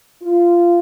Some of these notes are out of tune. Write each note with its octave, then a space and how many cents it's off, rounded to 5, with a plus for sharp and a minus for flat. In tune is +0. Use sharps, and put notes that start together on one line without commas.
F4 -15